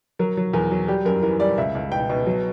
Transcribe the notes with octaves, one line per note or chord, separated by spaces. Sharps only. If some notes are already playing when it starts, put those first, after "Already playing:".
F#3 A#4
F#3
E2 A#4
F#3
G3 G4
F#2 A#4
E3 A#4
G3 D5
C#2 E5
C#2
B2 G5
B2
F#3